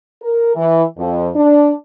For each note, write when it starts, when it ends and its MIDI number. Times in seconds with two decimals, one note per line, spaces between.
0.22 0.52 70
0.55 0.82 52
0.97 1.29 41
1.35 1.72 62